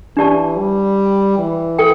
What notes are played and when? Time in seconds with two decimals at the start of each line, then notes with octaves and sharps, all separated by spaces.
0.17 E3 D4 G4 D5 A5
0.58 G3
1.38 E3
1.79 A4 G5